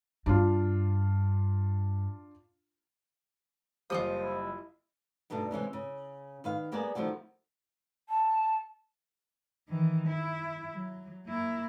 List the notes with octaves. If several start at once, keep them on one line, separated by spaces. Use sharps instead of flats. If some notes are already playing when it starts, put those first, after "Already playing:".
G2 D4 F4
F#1 F3 G3 F4 D#5 D#6
E4
G2 B2 A3 D4 D#4
C3 E3 G#3 C#4
C#3
D#3 B4 F5
G3 A#3 B3 G#4 A#4 D5
D#3 F3 G3 A3 F#4
A5
D#3 E3
E4
F#3
A#3 E4